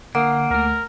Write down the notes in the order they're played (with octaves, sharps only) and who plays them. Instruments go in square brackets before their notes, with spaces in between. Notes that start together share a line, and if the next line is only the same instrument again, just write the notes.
[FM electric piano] D3 A#4 D#6 [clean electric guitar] A#3 [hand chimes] F#5
[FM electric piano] D2 A3 [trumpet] A#4